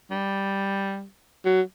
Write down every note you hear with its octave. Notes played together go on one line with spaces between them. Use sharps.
G3
F#3